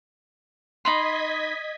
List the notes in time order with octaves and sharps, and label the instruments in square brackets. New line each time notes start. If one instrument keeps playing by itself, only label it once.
[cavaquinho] D#4 B5 C6 [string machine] D#5 G#6 B6